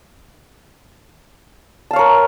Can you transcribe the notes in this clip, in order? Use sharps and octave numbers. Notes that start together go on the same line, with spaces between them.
A#4 C#5 F5 A5